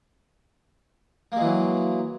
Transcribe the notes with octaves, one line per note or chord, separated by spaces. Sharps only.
E3 F#3 G#3 A#3